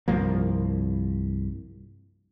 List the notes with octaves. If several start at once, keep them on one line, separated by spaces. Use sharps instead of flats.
C2 G2 F3 A#3